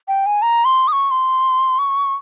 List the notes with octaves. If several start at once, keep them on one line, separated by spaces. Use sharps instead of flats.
G5
G#5
A#5
C6
D#6
C#6
C6
C#6